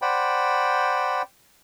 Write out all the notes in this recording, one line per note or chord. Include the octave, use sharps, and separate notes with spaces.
C5 D5 F#5 G5 B5